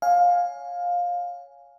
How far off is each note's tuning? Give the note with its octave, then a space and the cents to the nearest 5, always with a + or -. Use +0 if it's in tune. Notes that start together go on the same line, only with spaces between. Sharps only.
C#5 +0 F5 +15 G#5 +0